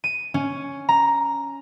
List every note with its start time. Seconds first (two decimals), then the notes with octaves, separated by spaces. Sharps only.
0.04 D#7
0.34 C#4
0.89 A#5